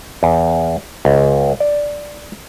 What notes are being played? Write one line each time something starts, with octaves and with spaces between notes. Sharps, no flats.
E2
C#2
D5